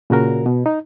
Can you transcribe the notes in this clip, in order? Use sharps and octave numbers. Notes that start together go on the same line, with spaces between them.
A#2 C#3 F#4 A#4
B2
D#4